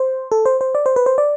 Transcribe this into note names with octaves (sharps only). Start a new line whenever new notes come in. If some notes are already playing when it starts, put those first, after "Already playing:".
Already playing: C5
A4
C5
C5
D5
C5
B4
C5
D5